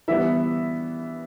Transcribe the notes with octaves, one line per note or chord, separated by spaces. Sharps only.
E3 G3 B3 E5